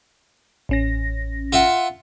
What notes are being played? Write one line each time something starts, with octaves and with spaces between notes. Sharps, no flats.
A1 C#4 A#6
F4 E5 F#5